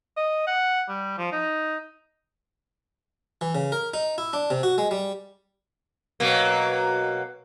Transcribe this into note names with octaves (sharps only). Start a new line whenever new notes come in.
D#5
F#5
G3
F3
D#4
E3
C#3
A#4
D#4
E4
D4
C3
F#4
G#3
G3
B2 F#3 A#3